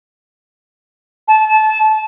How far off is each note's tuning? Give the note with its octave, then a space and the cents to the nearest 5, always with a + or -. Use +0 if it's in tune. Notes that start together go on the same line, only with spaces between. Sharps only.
A5 -25